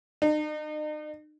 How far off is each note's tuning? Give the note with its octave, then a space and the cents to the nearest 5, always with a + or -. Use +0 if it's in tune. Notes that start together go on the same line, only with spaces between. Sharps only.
D#4 -40